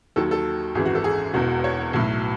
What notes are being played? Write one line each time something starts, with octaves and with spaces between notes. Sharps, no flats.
D#2 D#3 F#3 A4
A4
G#1 F#2 E3 G#4
F#4
A4
G#4
E1 E2 B2 F#4
C#5
B1 A2 F#3